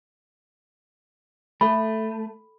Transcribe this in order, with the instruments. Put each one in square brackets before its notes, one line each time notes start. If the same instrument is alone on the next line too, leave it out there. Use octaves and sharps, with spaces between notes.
[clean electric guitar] A3 [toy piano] A4 B5